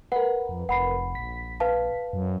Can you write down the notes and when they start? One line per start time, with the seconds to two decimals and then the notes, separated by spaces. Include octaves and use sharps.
0.12 A#4 B4 F#5
0.49 F2
0.69 F1 F#5 B5 C7
1.15 A#1 B6
1.60 B4 F5 A5
2.13 F#2